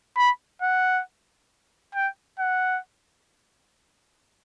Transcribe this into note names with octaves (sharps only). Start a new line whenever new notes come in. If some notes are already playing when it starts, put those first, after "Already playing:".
B5
F#5
G5
F#5